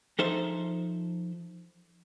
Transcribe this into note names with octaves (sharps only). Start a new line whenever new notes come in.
F3 D#4 A4 C5 E5